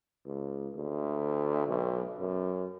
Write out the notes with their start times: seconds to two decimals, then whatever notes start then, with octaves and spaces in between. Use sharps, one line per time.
0.26 C#2
0.76 D2
1.68 B1
2.19 F#2